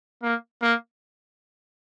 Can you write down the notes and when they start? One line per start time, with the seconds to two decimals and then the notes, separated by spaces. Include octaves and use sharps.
0.23 A#3
0.62 A#3